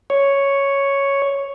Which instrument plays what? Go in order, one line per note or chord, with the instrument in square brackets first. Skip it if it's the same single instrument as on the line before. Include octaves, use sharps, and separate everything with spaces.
[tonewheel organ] C#5